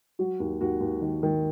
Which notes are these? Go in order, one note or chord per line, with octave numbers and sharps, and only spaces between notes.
F#3 F#4
D#2
D#2 F#4
D#2
D#3
D#3